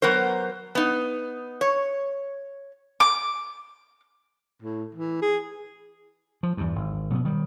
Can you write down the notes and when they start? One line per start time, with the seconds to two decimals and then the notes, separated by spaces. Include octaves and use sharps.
0.02 F#3 B3 A#4 C5
0.75 B3 D#4
1.61 C#5
3.00 D6
4.62 A2
4.95 E3
5.22 G#4
6.43 F3
6.57 E2 G2
6.76 G#1
7.10 B2 F#3 G3 B3
7.25 D#3 G3